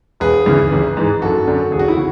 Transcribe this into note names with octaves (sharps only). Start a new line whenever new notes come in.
E1 G#4 B4
D2 C#3 E3
A1
G#2 E3
F#1 F#4 A4
F#2 D3
E1 G#4
F#4
E4
C#3 F#4